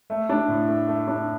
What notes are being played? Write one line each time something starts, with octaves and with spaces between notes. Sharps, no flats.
A3
D4
A2
A3
A3
D4